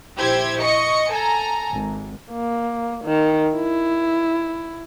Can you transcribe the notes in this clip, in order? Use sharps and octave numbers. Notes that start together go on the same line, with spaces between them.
A#1 E4 G4 C5 G#6
D#5 C#6 C#7
A4 G#5 A#5
G#1
A#3
D#3
E4